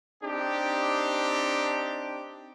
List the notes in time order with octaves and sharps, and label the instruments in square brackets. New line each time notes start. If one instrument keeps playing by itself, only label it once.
[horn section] C4 D4 D#4 G4